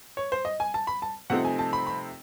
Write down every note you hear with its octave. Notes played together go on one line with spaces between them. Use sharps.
C#5
C5
D#5
G#5
A5
B5
A5
C3 F3 A3 C4 D#4 F#5
G#5
A5
B5
B5